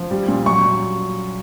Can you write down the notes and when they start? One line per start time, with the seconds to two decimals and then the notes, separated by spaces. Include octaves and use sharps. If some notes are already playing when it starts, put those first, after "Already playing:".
Already playing: F3
0.11 G3
0.28 A#2
0.46 F#3 C#6